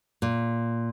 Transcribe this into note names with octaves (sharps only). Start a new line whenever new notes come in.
A#2